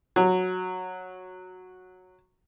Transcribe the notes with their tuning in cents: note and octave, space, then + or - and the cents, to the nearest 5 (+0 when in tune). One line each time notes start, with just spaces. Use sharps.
F#3 -10